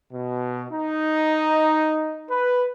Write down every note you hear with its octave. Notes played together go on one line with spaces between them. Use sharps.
B2
D#4
B4